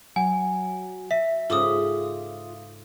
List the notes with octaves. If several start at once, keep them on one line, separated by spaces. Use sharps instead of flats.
F#3 F#5 G#5
E5 B6
G#2 C#3 F4 A4 D6 D#6